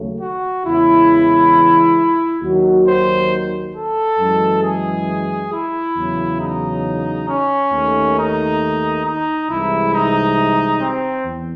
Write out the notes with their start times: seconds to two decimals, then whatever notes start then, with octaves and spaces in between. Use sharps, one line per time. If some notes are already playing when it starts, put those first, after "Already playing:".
Already playing: D#2 C#3 F#3 A3
0.21 F#4
0.65 E2 C#3 E3 G#3 E4
2.42 D#2 D#3 F#3 F#4
2.87 C5
3.75 A4
4.20 F#2 E3 G#3
4.63 G#4
5.51 E4
5.96 E2 C#3 F#3
6.39 D#4
7.29 C#4
7.72 D#2 D#3 A3
8.17 D#4
9.05 D#4
9.49 C2 C3 E3 G#3 E4
9.94 D#4
10.81 C4
11.25 E2